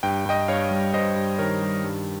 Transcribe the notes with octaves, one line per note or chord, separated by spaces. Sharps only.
G2 G5
G2 D#5 G5
G2 C#5 F5
G3
G2 C5 D#5
G2
D#3 A#4 C#5
G3
G2